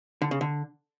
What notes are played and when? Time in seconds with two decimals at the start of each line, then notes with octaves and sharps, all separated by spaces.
0.22 D3
0.31 C#3
0.41 D3